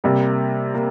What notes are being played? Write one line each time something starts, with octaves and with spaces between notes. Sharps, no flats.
C3 G3 A#3
A#3